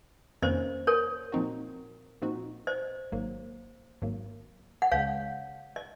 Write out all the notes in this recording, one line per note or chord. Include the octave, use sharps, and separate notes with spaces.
F2 C3 D#3 A#3 C#4 C5 D#5
A#4 C#5
A#2 F3 C4 D#4 F#4
A#2 F3 C4 D#4 F#4
C5 D#5
G#1 G#2 F#3 A#3
G#1 G#2 F#3 A#3
F#5
C#2 C#3 G#3 C#5 F5
D#5